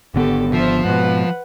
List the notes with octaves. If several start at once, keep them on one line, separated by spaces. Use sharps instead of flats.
G#1 D3 B3 G4 A4
F3 C5 E5
G#2 B2 B4 F#5